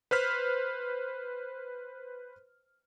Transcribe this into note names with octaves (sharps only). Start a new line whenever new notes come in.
B4 C5 F6 B6